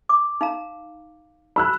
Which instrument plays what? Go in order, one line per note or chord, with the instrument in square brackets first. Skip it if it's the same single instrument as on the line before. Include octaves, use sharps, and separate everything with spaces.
[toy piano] D6
D#4 F5 A#5
[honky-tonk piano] B5 E6 F#6